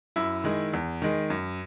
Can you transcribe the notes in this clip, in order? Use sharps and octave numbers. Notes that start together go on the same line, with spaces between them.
F#2 E4
D#3 G#3
E2
D#3 G#3
F#2